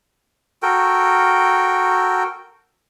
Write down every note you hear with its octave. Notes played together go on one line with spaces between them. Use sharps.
F#4 A4 A#4 G5